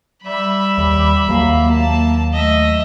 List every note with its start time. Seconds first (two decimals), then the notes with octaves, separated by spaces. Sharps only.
0.24 G3 E5 B5
0.78 D#2
1.28 D#2 F#3 A#3
1.69 A#3 A5
2.34 A3 D#5 E5